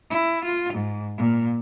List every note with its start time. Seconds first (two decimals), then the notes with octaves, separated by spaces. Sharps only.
0.10 E4
0.45 F4
0.74 G#2
1.18 A#2